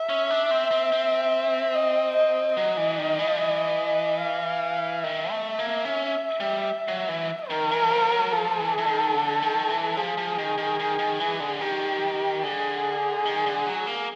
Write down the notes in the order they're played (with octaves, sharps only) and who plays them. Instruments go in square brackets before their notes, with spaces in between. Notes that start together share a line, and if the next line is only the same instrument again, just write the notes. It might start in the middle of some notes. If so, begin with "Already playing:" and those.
Already playing: [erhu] E5
[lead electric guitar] C#4
D4
C4
C4
C4
[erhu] D#5
D#5
[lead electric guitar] F#3 [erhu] D#5
[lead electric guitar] E3
D#3
E3
F3
E3
[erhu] F5
[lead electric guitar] D#3 [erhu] E5
[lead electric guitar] A3
A#3
C#4
G3
F#3
E3
[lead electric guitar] D#3 [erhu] A#4
[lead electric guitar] E3
F3
F#3
[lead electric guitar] F3 [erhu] A4
[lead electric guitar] E3
E3
D#3
D3
D#3
E3
[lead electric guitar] F3 [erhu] G#4
[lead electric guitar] F3
D#3
D#3
D#3
D#3
E3
D3
[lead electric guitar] D#3 [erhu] G4
[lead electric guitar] D3 [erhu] G#4
[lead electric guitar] D#3
D3
F#3
A#3